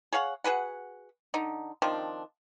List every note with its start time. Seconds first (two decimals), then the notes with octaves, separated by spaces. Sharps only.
0.13 G#4 C#5 F5 F#5
0.44 F#4 G#4 B4 F#5
1.34 D3 D#4
1.82 D#3 F3 C4 D4